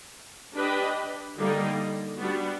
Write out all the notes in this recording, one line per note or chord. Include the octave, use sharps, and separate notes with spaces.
D4 G4 B4 D#5
D3 G3 A#3 D#4
G3 B3 D4 F#4